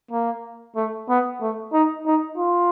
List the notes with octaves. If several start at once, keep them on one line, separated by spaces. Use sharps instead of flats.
A#3
A3
B3
A3
D#4
D#4
F4